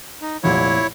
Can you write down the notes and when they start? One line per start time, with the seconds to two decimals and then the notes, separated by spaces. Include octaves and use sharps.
0.22 D#4
0.44 F1 C2 A#2 E4 C#5